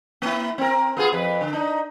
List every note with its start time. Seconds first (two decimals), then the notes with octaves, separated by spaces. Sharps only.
0.22 A#3 E4
0.58 C4 A#4
0.97 B3 F4 G#4
1.13 F2 B4
1.41 D3
1.53 D4 D#4